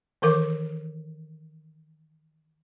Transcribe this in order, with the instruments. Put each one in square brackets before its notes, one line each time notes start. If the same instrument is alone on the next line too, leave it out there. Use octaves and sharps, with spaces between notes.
[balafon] D#3 E3 A4 A#4 D6